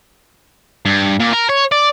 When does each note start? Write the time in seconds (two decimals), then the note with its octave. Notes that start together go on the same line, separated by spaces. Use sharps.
0.86 G2
1.20 A#2
1.33 A#4
1.50 C#5
1.72 D5